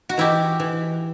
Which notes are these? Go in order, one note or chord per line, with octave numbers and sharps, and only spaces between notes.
F#4
E3 E4 G4
E3